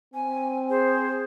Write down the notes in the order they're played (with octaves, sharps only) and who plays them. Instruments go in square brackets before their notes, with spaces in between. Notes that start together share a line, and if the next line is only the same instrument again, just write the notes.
[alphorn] C4 [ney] G#5
[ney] G#4 [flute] C5